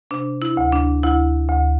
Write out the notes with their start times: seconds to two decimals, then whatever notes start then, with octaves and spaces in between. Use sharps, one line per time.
0.11 C3 D4
0.42 E4
0.57 D2
0.72 D4
1.03 D2 E4
1.49 D2